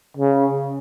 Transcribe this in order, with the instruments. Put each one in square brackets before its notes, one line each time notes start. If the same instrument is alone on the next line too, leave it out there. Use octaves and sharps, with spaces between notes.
[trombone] C#3